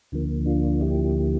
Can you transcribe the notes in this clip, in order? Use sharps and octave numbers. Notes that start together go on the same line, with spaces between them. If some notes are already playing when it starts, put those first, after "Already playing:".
D2 D3 F3 A#3
D4 F4
E4 G4